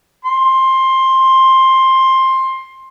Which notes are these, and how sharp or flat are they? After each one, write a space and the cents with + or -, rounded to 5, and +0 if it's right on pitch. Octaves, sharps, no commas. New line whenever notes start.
C6 +15